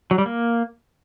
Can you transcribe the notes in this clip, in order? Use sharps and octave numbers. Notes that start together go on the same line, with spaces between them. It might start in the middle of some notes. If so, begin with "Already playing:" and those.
F#3
G3
A#3